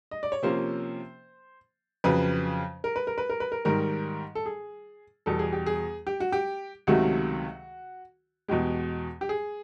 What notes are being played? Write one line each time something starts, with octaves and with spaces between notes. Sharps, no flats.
D#5
D5
C#5
C3 F3 A#3 C#4 C5
F2 C#3 F#3 B4
A#4
B4
A#4
B4
A#4
B4
A#4
G#2 D#3 G3 A#4
A4
G#4
E2 B2 G3 A4
G#4
G4
G#4
G4
F#4
G4
C#2 C3 D#3 F#3 A3 F#4
E2 B2 G#3 G4
G4
G#4